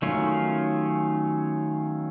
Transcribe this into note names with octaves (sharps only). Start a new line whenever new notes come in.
D#3 F#3 A3 C#4 F4